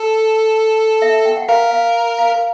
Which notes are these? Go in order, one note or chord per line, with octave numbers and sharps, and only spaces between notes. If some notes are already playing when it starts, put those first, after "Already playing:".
Already playing: A4
E5
G5
F#5
A#4 F5
F5
F5